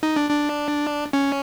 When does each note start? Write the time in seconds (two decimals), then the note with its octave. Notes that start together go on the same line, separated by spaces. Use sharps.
0.03 D#4
0.16 D4
0.30 D4
1.13 C#4